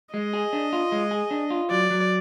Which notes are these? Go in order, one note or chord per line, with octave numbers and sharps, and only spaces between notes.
G#3 D#5
G#4
D4
F4
G#3
G#4
D4
F4
F#3 D5
F#3